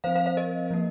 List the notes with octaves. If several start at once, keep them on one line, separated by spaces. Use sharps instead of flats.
F3 C4 C5 F5
C5 F5
C5 F5
A#4 D#5
F3 A#3